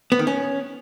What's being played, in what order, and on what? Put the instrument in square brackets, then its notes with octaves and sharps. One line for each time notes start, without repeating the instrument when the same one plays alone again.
[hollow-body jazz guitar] B3
D#3
C#4